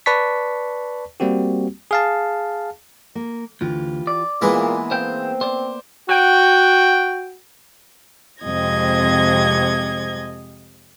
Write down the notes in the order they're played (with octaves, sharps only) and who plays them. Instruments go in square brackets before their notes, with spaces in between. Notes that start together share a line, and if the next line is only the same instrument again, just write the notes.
[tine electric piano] B4 D5 A5 C#6 B6
G3 A#3 C4 F#4 G4
G#4 F5 A5
[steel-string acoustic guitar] A#3
[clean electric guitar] D2 [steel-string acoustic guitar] E3 F4 G4
[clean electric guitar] D5
[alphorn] A#2 [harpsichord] E3 G#3 E4 [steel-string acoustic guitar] A#3 B3 E5
[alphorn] C4 [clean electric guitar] C5 F5 G5
[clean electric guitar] C5 D5
[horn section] F#4 G5
[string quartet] F2 C3 G#3 D#5 G#6 A#6